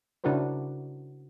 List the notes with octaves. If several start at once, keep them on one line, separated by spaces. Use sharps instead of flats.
C#3 D4 E4 F#4 A#4 C5